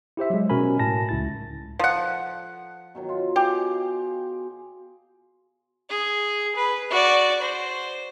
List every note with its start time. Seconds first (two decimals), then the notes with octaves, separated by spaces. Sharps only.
0.17 E4 G4 C5 E5
0.30 F#3 G#3
0.50 B2 C#4 F#4 A#4 G#5 B5
0.79 A2 A5 A#6
1.09 C#2 E4 A6
1.79 F3 A4 F#5
2.95 B2 D#3 F#3
3.09 F4
3.36 G4 G#4 F5
5.89 G#4
6.56 B4
6.91 F#4 D5
7.42 C5